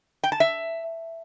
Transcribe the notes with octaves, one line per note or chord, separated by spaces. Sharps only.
G5
A5
E5